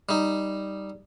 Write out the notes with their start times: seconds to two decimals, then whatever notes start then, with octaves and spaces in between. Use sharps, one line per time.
0.09 G3 D#4